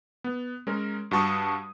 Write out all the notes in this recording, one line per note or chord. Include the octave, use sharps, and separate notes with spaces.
B3
G#3 C#4 A#4
G2 F#4 A5 C#6 D#6